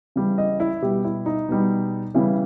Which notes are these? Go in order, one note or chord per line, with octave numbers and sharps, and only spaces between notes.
C#3 E3 G3
D#5
E4
B2 G3 G4
E4
D#4
B2 G3
C#3 E3 G3 E4